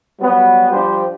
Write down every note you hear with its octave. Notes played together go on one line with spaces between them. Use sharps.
F#3 G3 B3
F3 G3 D4 G4 C5